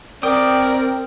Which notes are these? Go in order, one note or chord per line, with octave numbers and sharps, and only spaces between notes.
C4 A#4 D5 G5 D#6